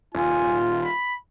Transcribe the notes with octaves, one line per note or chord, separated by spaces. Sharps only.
D#1 F4 G#5
B5